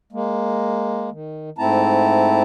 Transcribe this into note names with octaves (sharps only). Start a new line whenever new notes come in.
G#3 A#3
D#3
G#2 A3 C4 E4 A5 A#5